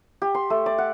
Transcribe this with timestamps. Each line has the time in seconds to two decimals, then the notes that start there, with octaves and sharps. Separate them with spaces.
0.22 G4
0.35 C6
0.50 A3
0.66 D5
0.78 F#5